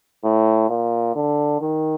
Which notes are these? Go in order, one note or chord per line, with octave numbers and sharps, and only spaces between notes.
A2
A#2
D3
D#3